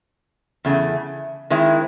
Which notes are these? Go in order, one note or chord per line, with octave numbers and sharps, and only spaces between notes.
E2 C#3 A3
D#3 G#3 C4 E4